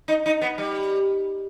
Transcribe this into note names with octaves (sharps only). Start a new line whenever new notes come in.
D#4
D#4
B3
G3